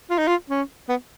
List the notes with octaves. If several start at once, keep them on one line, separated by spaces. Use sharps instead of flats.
F4
D#4
F4
C#4
B3